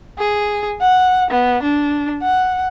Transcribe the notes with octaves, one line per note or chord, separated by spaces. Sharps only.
G#4
F#5
B3
D4
F#5